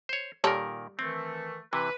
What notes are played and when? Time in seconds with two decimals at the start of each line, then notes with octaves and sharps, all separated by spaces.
0.09 C5 C#5
0.44 A#2 D#3 G3 A4 A#4 C#5
0.99 D#3 E3 A3 C4
1.73 C3 E3 B4